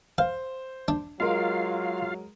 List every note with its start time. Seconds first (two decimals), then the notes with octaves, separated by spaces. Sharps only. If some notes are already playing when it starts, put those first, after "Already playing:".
0.18 C5 F5
0.88 D4
1.20 F#3 G#3 F4 A#4 F5